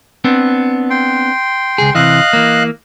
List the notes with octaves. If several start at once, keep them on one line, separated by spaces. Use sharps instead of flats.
B3 C4 D4
G5 C6
C#2 F#2 G#4
C3 E3 D#5 F5 F#6
E3 A#3